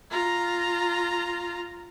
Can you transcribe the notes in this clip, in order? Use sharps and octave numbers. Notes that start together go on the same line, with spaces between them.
F4 A#5